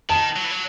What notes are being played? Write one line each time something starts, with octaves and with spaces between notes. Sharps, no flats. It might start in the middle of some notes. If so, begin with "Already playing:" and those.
D#3 A5
F#3
E3
F#3